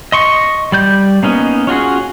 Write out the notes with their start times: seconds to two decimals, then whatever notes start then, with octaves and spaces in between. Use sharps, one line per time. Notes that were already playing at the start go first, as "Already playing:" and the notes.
0.12 D#5 C6 C#6
0.72 G3 D5 G6
1.23 A#3 B3 C#4 D#4
1.67 C#4 F4 F#4 G#4